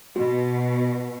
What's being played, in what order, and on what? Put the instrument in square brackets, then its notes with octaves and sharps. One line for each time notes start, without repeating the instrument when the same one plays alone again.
[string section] B2 [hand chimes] F#4